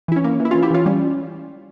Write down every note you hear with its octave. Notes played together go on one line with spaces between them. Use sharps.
E3 E4
C#4
A#3
E3
E4
E3 C#4 F4
E4 G4
E3 C#4 F4
G3 C#4